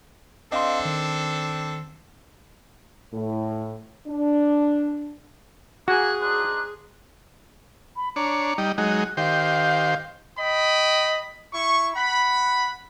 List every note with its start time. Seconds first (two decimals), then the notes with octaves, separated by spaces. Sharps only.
0.52 C4 D4 A4 D#5 F5 C6
0.85 D#3
3.13 A2
4.08 D4
5.88 A#3 F#4 G#4 G#5 F#6
6.21 D4 D#4 C5 F#6
7.96 B5
8.16 D4 C#5 A#5
8.58 G3 D#4
8.78 F#3 G#3 D#4 F#6
9.17 D#3 G4 C5 F5
10.38 D#5 G5 B5
11.53 E4 C#6
11.95 F#5 B5